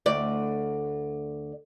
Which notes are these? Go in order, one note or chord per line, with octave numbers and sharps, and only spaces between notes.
D2 D5